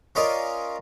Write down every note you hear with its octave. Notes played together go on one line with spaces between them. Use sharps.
C#4 F4 A#4 D5 D#5